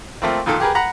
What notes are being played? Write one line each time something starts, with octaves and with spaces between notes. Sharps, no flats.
F3 A3 A#3 C4
F2 A#2 D#3 A4
G4 G#4 A#4 B4
F#5 A#5 B5